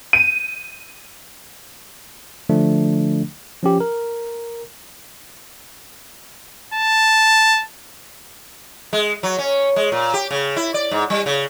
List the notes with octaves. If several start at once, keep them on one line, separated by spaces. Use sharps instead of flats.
D#7
D3 F3 A3 D4
F3 C#4 G4
A#4
A5
G#3
F#3
C#4
G#3
A#2
G4
C#3
E4
D5
G#2
G3
C#3